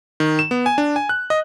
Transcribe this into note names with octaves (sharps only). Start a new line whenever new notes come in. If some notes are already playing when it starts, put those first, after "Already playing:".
D#3
E7
B3
G#5
D4
G#5
F#6
D#5